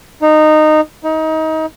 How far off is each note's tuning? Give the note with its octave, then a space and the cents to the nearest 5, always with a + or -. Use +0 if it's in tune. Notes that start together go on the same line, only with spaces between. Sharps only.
D#4 -15
D#4 +25